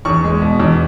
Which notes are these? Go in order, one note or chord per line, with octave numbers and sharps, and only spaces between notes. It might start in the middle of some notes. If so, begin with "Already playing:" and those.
E2 C#6
G#3
B2
E2